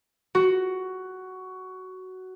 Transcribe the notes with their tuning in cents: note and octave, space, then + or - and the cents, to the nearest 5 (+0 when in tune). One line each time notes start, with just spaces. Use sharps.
F#4 +10